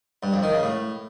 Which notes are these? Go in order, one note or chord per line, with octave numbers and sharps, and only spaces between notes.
G2
F2
D#3
C#3
A2